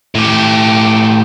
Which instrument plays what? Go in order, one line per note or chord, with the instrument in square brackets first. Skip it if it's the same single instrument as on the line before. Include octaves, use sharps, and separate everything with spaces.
[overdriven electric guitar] A2 G4